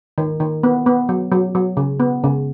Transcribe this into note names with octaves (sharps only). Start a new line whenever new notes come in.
D#3
D#3
B3
B3
F#3
F#3
F#3
C#3
B3
C#3